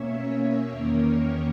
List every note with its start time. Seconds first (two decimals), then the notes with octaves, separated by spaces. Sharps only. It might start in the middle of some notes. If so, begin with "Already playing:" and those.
Already playing: B2 A#3 C#4 C#5 E5
0.13 C#5 E5
0.70 E2 D#3 A#3 C#4 A#4 C#5